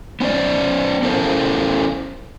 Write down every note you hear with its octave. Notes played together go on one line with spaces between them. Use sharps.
B3 C#4 F#4 C5 D5
C#4 E4 A4 A#4 C5